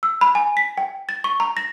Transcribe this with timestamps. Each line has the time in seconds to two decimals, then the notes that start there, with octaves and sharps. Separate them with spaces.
0.03 E6
0.21 B5
0.35 G#5
0.57 B6
0.78 G5
1.09 A6
1.24 C#6
1.40 A#5
1.57 A#6